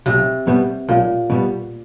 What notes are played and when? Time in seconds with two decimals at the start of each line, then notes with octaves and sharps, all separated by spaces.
0.06 B1 C3
0.47 B2 G3 B3
0.88 B1 A#2
1.30 B2 G3 B3